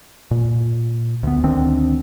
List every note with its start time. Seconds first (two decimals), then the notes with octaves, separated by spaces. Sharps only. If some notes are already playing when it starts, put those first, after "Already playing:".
0.31 A#2
1.23 D2 B3
1.43 D2 D#3 C4 D4